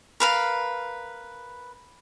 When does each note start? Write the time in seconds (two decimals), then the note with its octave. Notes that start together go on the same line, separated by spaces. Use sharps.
0.20 A#4 B4 F5